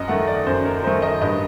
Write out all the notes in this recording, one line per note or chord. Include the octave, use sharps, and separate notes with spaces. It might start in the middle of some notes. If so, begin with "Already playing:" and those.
Already playing: F#2 D#5
D#3 A3 F#5
D5
F#2 C5
A#4
D#3 A3 C5
D#5
G2 D#5